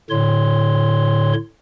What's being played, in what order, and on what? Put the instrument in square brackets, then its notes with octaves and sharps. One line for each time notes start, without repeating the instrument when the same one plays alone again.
[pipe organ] A2 D3 C#5 C6